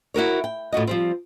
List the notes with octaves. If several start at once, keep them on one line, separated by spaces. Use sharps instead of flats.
E4 F#4 A#4 C#5
G5
A2 F4 F#4 D#5
F3 G3 C4